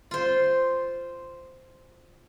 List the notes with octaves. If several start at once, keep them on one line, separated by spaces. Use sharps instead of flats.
F4 C5